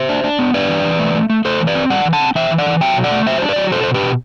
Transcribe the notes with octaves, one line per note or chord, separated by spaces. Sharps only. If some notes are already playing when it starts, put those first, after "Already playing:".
Already playing: C5 E5
D4
D4
B3
D4 B4 D5
E3
E3
A3
A3
A3
A3 A4 C5
E3
B4 D5
C4
G3 D5 F#5
E3
F#5 A5
C4
E3 E5 G5
E3
D5 F#5
E3
F#3 E5 G5
B2
D5 F#5
A3
F#3 C5 E5
D4
B4 D5
F#3
B2 A4 C5
B2 C5
G4 B4
B2